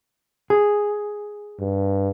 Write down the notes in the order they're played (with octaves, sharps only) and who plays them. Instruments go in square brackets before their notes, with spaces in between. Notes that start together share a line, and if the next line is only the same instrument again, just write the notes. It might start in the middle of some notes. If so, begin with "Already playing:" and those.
[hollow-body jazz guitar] G#4
[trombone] G2